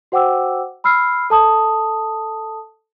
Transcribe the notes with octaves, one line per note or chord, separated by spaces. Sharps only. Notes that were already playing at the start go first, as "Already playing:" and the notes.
F#4 C5 F#5 G5 D6 E6
B5 E6 F6 C7
A4 A5 D#6